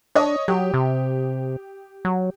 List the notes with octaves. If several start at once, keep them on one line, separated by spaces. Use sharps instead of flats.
D4 C#5 D#5 D#6
F#3 G4
C3
F#3